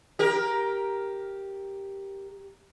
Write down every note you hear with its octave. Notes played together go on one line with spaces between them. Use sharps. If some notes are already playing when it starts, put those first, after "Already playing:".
G4 A#4